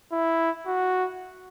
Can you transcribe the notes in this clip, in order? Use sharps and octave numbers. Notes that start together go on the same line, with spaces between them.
E4
F#4